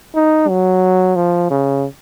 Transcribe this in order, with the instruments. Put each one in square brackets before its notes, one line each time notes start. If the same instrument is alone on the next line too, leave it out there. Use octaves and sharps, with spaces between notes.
[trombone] D#4
F#3
F3
C#3